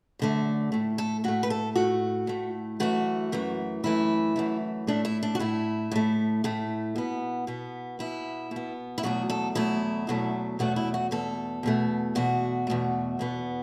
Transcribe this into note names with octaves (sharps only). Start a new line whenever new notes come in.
F#2 D3 A3
A2 A3
A4
A2 A3 F#4
B4
A4
A2 A3 F#4
A2 A3
F#2 E3 A3 F#4
F#2 E3 A3
F#2 E3 A3 E4
F#2 E3 A3
A2 A3 D4
E4
D4
F#4
A2 A3 E4
A2 A3
A2 A3
B2 B3
B2 B3
B2 B3 E4
B2
B3
E4
E2 B2 F#3 A3 F#4
A4
E2 B2 F#3 A3 E4
E2 B2 F#3 A3
E2 B2 F#3 A3 F#4
E4
F#4
E2 B2 A3 A4
E2 B2 A3
E2 B2 A3 F#4
E2 B2 A3
E2 B2 B3